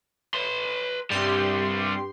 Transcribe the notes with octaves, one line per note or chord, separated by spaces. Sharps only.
B4 C6
G2 G3 C4 G4 C6